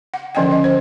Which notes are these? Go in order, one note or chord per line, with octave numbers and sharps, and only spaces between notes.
F#5
D3 F3 C#4 D5 D#5 G5
D#5
C5